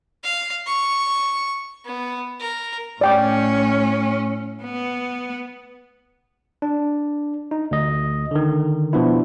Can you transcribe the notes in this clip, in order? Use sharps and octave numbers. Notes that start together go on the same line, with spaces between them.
F5
C#6
B3
A#4
A2 C#4 D5 G5 D6
B3
D4
D#4
D2 D#5
D3 D#3
B2 F3 B3 D4 E4